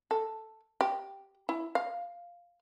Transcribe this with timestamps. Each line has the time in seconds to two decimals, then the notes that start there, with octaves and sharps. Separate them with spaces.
0.11 A4
0.81 G4
1.49 E4
1.75 F5